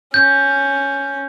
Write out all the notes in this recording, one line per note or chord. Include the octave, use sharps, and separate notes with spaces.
C#4 G6